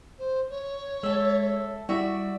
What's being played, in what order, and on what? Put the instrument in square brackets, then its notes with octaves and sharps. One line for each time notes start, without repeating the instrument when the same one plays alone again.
[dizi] C5
C#5
[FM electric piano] G#3 [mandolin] A4 E5
[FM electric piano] G3 E4 [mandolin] F#4 E5 [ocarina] D5